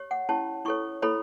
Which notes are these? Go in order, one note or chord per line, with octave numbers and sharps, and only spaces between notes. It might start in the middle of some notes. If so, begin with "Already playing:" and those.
Already playing: G4 C#5
F#5
C#4 E4 G4 C#5 A5
E4 A4 C#5 C#6
E4 A4 C#5 B5